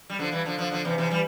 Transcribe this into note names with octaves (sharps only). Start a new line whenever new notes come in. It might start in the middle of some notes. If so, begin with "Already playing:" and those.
G3
D3 F3
E3 G3
D3 F3
D3 F3
D3 F3
C3 E3
C3 E3
E3 G3